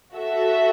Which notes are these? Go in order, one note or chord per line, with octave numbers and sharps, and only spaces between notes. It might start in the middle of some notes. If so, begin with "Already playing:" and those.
F#4 A4 E5